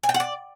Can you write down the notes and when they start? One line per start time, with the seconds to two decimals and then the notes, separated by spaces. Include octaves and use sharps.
0.03 G#5
0.09 G5
0.14 F#5
0.20 D5